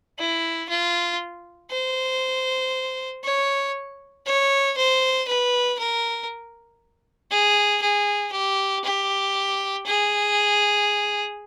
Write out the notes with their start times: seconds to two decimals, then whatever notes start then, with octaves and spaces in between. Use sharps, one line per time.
0.19 E4
0.69 F4
1.71 C5
3.24 C#5
4.26 C#5
4.77 C5
5.28 B4
5.79 A#4
7.31 G#4
7.82 G#4
8.32 G4
8.84 G4
9.86 G#4